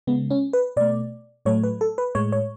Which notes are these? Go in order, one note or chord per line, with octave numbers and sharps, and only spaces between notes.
C#3 G#3 B3
C#4
B4
B2 A3 D5
A2 F#3 A3 C#5
B4
A4
B4
A2 G#3 C#5
C#5